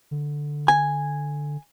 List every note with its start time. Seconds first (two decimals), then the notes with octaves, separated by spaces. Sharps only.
0.11 D3
0.68 G#5